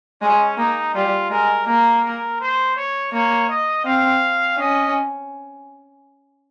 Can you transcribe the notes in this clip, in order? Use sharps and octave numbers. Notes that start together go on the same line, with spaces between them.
G#3 C#4
A#3 D#4
G3 F4
G#3 A#4
A#3 A#4
A#4
C5
C#5
A#3 C#5
D#5
C4 F5
C#4 D#5